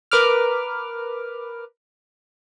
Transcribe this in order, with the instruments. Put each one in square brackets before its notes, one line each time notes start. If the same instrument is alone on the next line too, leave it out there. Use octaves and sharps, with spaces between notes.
[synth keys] A#4 B4 D6 F6